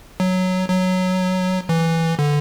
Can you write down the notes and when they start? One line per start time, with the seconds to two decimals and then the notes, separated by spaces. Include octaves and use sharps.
0.20 F#3
0.70 F#3
1.69 E3
2.19 D3